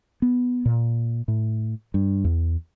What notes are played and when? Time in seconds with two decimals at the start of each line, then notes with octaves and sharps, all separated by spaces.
0.22 B3
0.65 A#2
1.28 A2
1.94 G2
2.24 E2